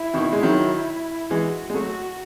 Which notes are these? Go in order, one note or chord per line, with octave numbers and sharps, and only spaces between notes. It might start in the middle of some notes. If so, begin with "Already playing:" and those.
Already playing: E4
B2 D#3
G#3
D#3 F#3
E3 G#3 F#4
G#3
F#3 A3 F#4